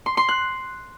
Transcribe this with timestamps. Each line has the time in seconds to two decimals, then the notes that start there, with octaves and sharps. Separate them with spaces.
0.06 C6
0.17 C6
0.29 F#6